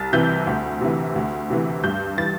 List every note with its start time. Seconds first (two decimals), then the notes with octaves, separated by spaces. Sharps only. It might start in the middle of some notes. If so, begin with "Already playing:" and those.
Already playing: C2 A6
0.13 C3 E3 G6
0.47 D2
0.81 C3 E3
1.16 D2
1.50 C3 E3
1.84 G2 G6
2.18 E3 A6